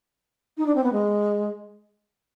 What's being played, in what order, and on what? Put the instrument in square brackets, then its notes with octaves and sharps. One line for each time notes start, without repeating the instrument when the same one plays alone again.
[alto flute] D#4
D4
C4
B3
G#3